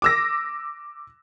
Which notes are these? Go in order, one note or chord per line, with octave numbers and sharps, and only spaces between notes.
D6 E6 A#6